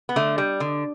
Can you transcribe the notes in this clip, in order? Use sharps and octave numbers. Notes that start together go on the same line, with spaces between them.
B3
D3 A3
G3
D3